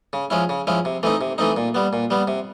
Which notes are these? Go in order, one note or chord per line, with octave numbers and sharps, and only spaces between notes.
C#3
F3 G#3 C#4 E4
C#3
F3 G#3 C#4 E4
C3
E3 A3 C4 D#4
C3
E3 A3 C4 D#4
A#2
G3 B3
A#2
G3 B3
C3